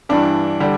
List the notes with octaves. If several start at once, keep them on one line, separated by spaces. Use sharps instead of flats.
G2 E3 G3 D4
D3 G3